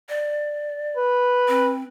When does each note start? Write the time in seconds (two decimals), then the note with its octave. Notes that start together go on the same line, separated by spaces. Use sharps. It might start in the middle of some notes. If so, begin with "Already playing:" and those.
0.09 D5
0.97 B4
1.48 C4